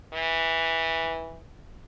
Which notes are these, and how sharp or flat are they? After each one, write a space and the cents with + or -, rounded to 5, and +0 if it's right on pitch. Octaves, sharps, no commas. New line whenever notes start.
E3 -10